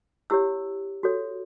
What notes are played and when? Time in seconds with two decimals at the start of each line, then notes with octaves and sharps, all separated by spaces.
0.30 E4 G4 C#5 E6
1.03 F#4 A4 C#5